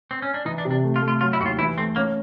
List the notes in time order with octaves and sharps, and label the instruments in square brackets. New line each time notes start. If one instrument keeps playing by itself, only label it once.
[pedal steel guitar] C4
C#4
D4
[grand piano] E3 [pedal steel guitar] D#4
[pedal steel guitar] D4
[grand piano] C3
[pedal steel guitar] D4
[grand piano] A3
[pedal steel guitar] F4
[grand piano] A3
[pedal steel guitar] F4
[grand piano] F#3 [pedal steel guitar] F4
[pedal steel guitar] E4
[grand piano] D#2 [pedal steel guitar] F#4
[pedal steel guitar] F4
[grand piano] E3 [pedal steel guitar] E4
[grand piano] A3 [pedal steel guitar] C4
[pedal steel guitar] A#3 [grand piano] C#4